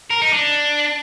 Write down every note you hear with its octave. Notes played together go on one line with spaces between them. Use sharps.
A#4
D#4
D4